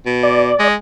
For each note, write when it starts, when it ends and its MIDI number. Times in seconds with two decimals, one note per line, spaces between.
0.06 0.51 47
0.23 0.68 74
0.59 0.74 56